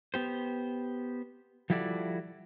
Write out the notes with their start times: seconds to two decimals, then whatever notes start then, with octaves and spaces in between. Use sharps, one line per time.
0.14 B3 G4 C5
1.70 F3 G3 E4 F#4 A4 D5